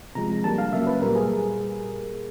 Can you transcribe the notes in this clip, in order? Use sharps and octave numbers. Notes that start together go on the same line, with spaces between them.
C3 F3 G#3 A#5
D3 G3 A#3 A5
F5
C#3 F#3 A#3 E5
B4
A#2 G3 A#3 A#4
G#4